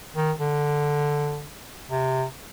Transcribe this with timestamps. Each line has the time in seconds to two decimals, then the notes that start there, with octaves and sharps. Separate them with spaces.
0.15 D#3
0.39 D3
1.90 C3